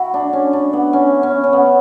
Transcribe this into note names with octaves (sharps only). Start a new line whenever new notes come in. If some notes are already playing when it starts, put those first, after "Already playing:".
Already playing: E4 F#4
D4
C#4
D4
B3
C#4
C#4
C#4
B3